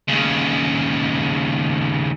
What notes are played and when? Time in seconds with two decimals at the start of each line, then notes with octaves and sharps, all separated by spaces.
0.08 D#2 C#3